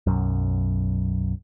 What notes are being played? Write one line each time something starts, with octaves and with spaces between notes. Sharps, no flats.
B1 F#2